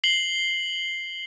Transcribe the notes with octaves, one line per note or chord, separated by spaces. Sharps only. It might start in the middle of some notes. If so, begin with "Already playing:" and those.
C7 F#7 G7